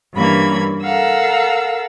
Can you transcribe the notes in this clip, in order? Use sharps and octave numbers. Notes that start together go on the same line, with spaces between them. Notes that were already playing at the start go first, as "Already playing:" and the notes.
G2 E3 A#3 C#4 B5 G#6
A4 A#4 F5 F#5 E6